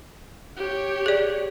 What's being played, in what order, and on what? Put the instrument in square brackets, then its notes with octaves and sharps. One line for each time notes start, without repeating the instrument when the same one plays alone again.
[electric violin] G4 C#5
[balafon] G#4 D5